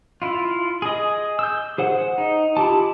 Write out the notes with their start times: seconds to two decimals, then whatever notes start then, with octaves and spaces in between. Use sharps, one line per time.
0.22 E4 F4
0.82 G#4 D#5
1.39 E6 G6
1.78 G#4 C5 F#5
2.18 D#4
2.57 E4 F4 G4 A5